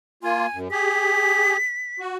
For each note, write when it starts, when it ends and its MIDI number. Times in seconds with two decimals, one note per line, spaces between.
0.23 0.46 58
0.23 0.46 65
0.23 0.57 80
0.54 0.68 42
0.71 1.57 67
0.71 1.57 68
0.71 2.00 95
2.00 2.18 66